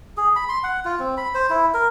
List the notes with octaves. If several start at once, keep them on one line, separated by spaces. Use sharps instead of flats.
G#4
B5
C6
F#5
F4
C4
B5
C5
E4
A#4